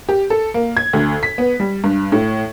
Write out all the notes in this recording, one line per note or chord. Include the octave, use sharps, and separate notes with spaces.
G4
A4
A#3
G#6
D2
B6
B3
G3
G2
A2